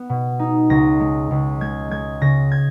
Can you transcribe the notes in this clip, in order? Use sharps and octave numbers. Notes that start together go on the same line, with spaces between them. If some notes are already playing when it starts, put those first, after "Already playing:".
Already playing: B3
B2
D#4
C#2 A#6
G#3
C#2
G#3 G#6
G#3 G#6
C#3 A#6
G#6